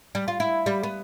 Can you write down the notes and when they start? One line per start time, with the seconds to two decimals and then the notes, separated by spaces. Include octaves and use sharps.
0.15 G3
0.28 F4
0.40 E4
0.66 G3
0.83 B3